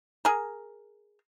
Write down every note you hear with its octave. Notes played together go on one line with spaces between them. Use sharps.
G#4 A#4